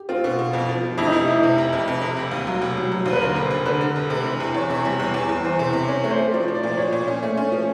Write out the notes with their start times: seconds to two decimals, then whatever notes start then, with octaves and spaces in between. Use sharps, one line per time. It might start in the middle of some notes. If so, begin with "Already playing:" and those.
Already playing: G4
0.09 C4 F4
0.24 B2
0.39 B2
0.53 F2
0.69 F3
0.83 F3
0.98 F2 E4
1.05 D#4
1.12 F1 E4
1.28 F1
1.43 C3
1.58 F1
1.73 F2
1.88 F2
2.02 C3
2.17 F1
2.31 D#2
2.47 F#3
2.62 F1
2.77 F#3
2.92 F#3
3.04 D#2 C5
3.13 B4
3.20 D3 A#4
3.36 F1
3.43 C5
3.51 F1
3.66 D3 B4
3.81 D3
3.96 F1
4.10 C3
4.25 E3
4.40 E2
4.54 E2 C#5
4.70 C3
4.85 G3
4.99 E2 C#5
5.14 E2
5.29 E2
5.44 E3 C5
5.59 C3
5.73 C3
5.88 C#4 C#5
6.04 A3
6.11 C5
6.18 A3
6.33 F3 D5
6.48 F3
6.55 D5
6.63 A#2
6.77 F3 C#5
6.93 A#2
7.08 C#4
7.23 A3
7.37 C#4
7.52 F3